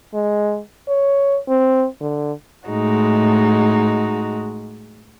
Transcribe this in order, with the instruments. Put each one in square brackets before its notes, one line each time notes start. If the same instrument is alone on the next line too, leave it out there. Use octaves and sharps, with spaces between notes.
[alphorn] G#3
C#5
C4
D3
[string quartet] A2 G#3 D#4 F#4